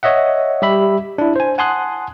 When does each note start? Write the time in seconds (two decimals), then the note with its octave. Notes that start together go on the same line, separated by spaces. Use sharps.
0.03 C#5 D#5 E5 F#5
0.62 G3 G4 E5 B5
1.18 D4 E4
1.36 C5 G#5
1.58 F#5 G#5 A5 C6 D#6 F#6